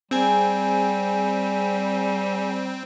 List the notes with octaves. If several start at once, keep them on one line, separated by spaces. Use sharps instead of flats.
G3 C4 G#4 G#5